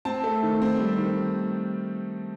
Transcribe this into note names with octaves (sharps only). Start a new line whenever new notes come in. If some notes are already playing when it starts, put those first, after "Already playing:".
C4 A5
A3
D#3
C4
G3
D#3